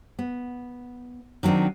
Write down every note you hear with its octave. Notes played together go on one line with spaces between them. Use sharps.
B3
D#3 F#3 A3 C4 D4